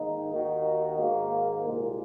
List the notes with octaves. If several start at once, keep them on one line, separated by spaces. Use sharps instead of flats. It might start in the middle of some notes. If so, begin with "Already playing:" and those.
Already playing: G#2 D#3 A#3 D#4
D#2 D#3 A#3 D#4 F#4
G#2 D#3 A#3
C2 A#2 G#3